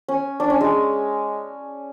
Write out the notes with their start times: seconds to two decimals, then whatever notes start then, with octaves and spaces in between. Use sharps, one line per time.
0.08 C#4
0.40 D4
0.50 C#4
0.61 G#3